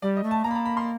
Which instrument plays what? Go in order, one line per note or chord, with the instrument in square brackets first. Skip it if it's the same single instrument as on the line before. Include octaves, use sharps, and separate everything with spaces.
[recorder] G3 [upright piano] D5
[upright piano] D#5
[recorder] A3
[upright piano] A5
[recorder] A#3 [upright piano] A#5
[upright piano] B5
A#5
B5
C6